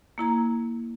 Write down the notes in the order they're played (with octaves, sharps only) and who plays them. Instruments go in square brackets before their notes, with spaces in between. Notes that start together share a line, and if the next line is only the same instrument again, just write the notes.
[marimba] A#3 E4 A#5 G#6